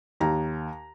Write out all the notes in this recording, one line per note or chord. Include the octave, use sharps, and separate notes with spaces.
D#2 A#5